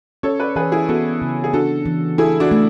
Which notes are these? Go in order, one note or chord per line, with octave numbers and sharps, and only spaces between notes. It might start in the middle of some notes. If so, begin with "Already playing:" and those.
C#4 A4 C#5
B4 D5
E3 G#4 B4
E4 G#4
B3 F#4 A4
C#3
G#4
D4 F#4 A4
E3
E4 G#4 A4
D4 F#4
A3